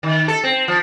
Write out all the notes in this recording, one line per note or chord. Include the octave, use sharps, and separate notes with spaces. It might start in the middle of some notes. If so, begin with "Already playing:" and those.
D#3
A4
C4
F3